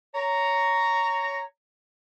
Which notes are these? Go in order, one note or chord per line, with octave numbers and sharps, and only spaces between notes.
C#5 A#5